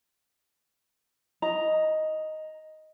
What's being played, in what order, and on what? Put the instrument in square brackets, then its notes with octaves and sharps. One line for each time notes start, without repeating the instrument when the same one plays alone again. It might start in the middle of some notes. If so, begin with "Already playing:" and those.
[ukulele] D#5 A#5